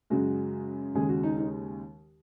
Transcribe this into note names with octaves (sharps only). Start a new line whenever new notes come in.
F#2 C#3 G#3 F#4
D#2 C#3 G#3 G#4
F#4
D#4
D#4